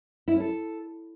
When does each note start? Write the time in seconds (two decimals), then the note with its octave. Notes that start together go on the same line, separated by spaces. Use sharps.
0.28 E4
0.34 C#4
0.40 A4